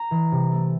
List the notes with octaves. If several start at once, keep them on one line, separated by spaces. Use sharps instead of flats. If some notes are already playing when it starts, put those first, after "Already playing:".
Already playing: A#5
E3
C3
A3